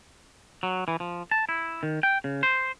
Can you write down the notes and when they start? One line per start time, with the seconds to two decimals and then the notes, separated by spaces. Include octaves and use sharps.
0.63 F#3
0.88 E3
1.00 F3
1.31 A5
1.49 E4
1.83 D#3
2.03 G5
2.24 C#3
2.43 C5